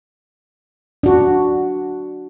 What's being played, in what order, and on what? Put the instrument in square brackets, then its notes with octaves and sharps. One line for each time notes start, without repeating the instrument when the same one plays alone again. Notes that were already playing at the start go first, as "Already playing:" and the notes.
[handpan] D4 F#4